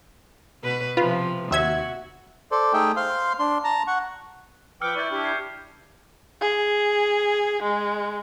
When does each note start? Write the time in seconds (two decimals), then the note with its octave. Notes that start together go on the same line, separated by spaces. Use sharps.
0.63 B2 B4
0.97 C3 F3 F4 B4
1.51 D#2 F#4 E5 G#6
2.51 A4 C5 D5
2.73 A3 D#4 G#4 E5 G5
2.97 C5 F5 C6
3.39 D4 C6
3.64 A5 A#5
3.87 F#5 C#6
4.81 F3 B4 G5 D6 E6 F6 C#7
4.96 E4 D5 C#6 G6
5.10 D4 E4 G4
5.24 G#6 C7
6.41 G#4
7.62 G#3